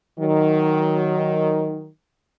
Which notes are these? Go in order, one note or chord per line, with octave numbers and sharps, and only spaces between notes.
D#3 F#3